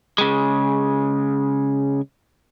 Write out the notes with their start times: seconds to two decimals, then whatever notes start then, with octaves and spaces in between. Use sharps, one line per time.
0.18 C#3 G#3